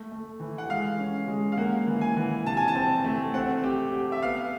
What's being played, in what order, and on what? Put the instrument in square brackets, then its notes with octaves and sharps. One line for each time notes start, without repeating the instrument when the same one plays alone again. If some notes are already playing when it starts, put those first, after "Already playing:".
Already playing: [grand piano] A3
A3
E3
[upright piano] F#5
[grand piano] G#3 [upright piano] F5
[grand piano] C#4
G#3
[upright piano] F5
[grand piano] A#3 [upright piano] F#5
[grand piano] E3
[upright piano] G#5
[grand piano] E3
[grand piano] C3 [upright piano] A5
[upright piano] G#5
A5
[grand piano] C4
A3
[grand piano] C4 [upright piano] F#5
[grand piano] G4
G4
[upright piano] E5
[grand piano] B3 [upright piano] F5